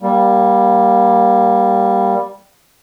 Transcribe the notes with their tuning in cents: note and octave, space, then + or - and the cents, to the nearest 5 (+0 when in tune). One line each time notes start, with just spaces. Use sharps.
G3 +0 A#3 +20